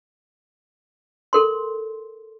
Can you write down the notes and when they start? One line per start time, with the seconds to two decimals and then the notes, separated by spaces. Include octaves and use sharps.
1.33 A4 A#4 C6